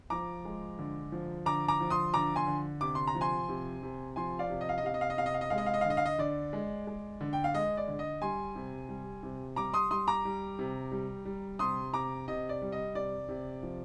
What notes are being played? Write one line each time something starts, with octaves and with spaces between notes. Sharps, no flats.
F3 A#5 D6
G#3
D3
F3
D3 A#5 D6
A#5 D6
F3
C6 D#6
D3 A#5 D6
G#5 C6
D3
C3 D6
C6
A#5
F3
G#5 C6
C3
C3
F3 G#5 C6
D5 F5
C3
D#5
F5
D#5
C3 F5
D#5
F5
D#5
C3 F5
D#5
F5
D#5
G#3 F5
D#5
F5
D#5
F5
D3
D#5
F5
D#5
D3 D5
G#3
G#3
D3
G5
F5
G#3 D#5
D5
D3
D#5
G3 G#5 C6
C3
G3
C3
G3 A#5 D6
C6 D#6
G3 C6 D#6
A#5 D6
G3
C3
G3
G3
C3 C6 D#6
C3 A#5 D6
C3 D#5
D5
G3
D#5
C3 D5
C3
F3